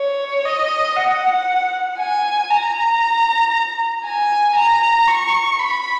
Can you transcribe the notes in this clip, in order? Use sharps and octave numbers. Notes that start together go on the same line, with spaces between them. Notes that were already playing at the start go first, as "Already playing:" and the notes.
Already playing: C#5
D#5
F#5
G#5
A#5
G#5
A#5
C#6
B5